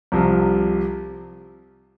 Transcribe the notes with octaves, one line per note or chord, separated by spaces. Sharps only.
C2 C3 F3